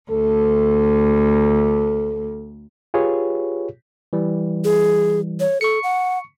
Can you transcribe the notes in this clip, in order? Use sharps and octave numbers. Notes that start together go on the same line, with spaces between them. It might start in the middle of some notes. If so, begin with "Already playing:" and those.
D2 A4
F4 G4 G#4 B4 C#5
E3 G3
G#4
C#5
A4 C#6 C#7
F#5